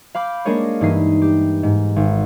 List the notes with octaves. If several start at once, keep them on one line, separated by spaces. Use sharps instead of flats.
F5 B5 D6 G6
G#3 A#3 D4 G#4 A#4 C#5
G2 E3 D#4 D#6 B6 C7
G4
G#2
G#1